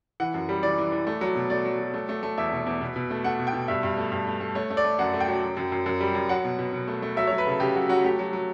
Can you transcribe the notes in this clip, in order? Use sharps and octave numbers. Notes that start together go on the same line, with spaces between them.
E3 F#5
F#2
G3
E3 D5
E3
E3
A3
F#3
B2
A3 D5
F#3
F#3
A3
A3
A3
E2 E5
B2
E2
B2
B2
A3
A3 F#5
B2
G5
B2
G2 E5
G2
A3
G2
A3
A3
A3 C#5
A3
D5
A3
F#2 F#5
A3
G5
F#3
F#2
F#2
F#2
F#2
G3
F#2
F#3 F#5
B2
B2
B2
A3
A3
F#3 E5
F#3 C#5
B4
C#3 A4
C#3 G4
F#3 F#4
F#3 F#4
A3 G4
F#3
F#3